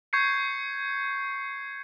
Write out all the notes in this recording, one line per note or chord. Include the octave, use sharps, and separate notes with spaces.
C#6 G6 G#6 C7 C#7